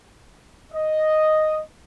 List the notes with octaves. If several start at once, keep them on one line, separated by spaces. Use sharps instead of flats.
D#5